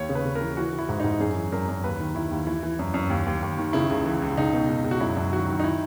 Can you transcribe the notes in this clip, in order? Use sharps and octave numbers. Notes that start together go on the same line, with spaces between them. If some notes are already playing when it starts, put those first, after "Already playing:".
Already playing: D#2 C#5
C#3
B4
C#3
A#4
E3
E3 F#4
E3
E4
G#2
G#2 D#4
F#2 G#4
E3
F#2 A#4
F#2
D#2 B4
D#3
D#3 E4
D#2
E3 E4
E3
F#2
F#2
D#2
D#2
D#2
D#3
C#3 E4
C#2
E3
C#2
C#2 D#4
B2
C#2
C#2
F#4
F#2 E4
F#2
D#3 F#4
D#3
D#4
E4